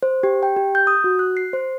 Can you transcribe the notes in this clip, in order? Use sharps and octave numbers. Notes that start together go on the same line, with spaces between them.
C5
G4
G5
G4
G6
D#6
F#4
F#6
C7
C5